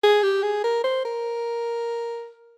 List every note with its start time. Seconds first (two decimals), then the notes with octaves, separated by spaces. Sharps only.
0.03 G#4
0.22 G4
0.42 G#4
0.64 A#4
0.83 C5
1.05 A#4